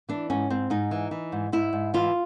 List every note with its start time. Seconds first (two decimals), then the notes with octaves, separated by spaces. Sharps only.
0.09 E3 D4
0.30 G#2 C#4
0.50 G#2 C4
0.70 G#2 D#4
0.91 E3
1.11 E3
1.32 G#2
1.52 G#2 E4
1.73 G#2
1.94 E3 F4